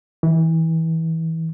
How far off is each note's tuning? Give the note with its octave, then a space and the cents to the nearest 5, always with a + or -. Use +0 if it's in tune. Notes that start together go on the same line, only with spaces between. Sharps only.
E3 -25